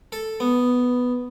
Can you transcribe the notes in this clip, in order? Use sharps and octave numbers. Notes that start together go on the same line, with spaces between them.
A4
B3